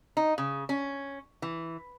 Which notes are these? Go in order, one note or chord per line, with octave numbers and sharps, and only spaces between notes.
D#4
C#3
C#4
E3